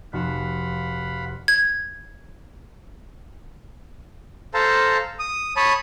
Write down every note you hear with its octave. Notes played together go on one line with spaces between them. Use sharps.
F1 F#4 F5 F#5 B5 E7
G#6
A4 C5 F5 A5 A#5
D#6
C#5 A5 B5 D#6